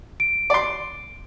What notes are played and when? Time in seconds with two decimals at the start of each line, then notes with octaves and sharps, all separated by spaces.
0.20 D7
0.50 D5 C6